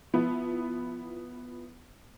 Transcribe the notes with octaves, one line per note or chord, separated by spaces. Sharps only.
F3 B3 E4